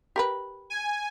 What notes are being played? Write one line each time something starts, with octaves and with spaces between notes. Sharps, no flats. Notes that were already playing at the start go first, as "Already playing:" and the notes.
G4 A#4 B4
G#5